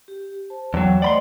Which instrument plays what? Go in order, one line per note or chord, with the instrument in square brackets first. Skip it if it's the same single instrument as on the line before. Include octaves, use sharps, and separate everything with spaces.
[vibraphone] G4
C5 A5
[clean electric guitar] E2 F#3 [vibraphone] C#5 F#5 G5
[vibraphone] A3 C5 D#5 [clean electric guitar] D5 B5 C6